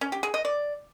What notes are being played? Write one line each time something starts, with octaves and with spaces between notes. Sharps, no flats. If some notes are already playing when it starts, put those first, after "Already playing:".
C#4
G4
G#4
D#5
D5